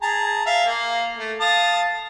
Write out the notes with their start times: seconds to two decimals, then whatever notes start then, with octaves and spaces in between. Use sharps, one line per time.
0.02 G#4 A5 A#5
0.46 E5 F5
0.66 A#3
1.18 A3
1.40 F5 A5 D#6